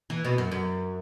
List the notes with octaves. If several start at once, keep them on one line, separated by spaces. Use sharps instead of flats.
E3
B2
F#2
F#2